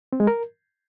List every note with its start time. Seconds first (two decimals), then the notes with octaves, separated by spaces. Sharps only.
0.13 C4
0.20 G#3
0.27 A#4